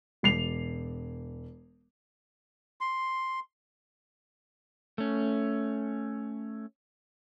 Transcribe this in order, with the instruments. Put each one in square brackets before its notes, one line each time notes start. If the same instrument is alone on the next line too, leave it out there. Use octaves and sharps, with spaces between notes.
[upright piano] E1 C7 F7
[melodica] C6
[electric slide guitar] A3 C#4